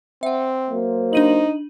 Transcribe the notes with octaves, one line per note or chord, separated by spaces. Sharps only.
C4 E5 F#5
F#3 A#3 C5
D4 D#4 D#7 F#7